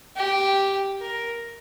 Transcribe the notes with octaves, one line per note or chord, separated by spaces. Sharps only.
G4
A#4